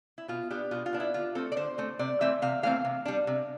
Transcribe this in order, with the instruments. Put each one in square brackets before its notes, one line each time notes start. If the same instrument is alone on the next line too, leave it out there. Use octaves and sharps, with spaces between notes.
[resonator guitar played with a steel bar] E4
B2 F4
B3 D4 G4
B2 F4
F4
B3 D4
E4
D3 F4
A3 C4 A4
D5
D3 C5
A3 C4
C3 D5
E3 A3 C4 E5
C3 F5
E3 A3 C4 F5
C3
G3 D4
C3